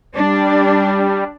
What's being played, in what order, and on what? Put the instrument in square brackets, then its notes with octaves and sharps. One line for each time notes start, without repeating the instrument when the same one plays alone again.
[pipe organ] G3 [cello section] D4